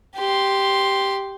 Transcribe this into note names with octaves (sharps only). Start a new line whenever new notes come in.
G4 C6